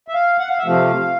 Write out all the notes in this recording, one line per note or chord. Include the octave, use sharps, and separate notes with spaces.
E5
F5
F#5
F5
E5
C3 F3 A3 F5